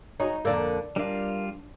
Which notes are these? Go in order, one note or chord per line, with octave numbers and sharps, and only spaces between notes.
D#4 F#4 G#4 C#5
F2 D3 A#3 A4 D5 A5
G3 D4 F4 A#4 F5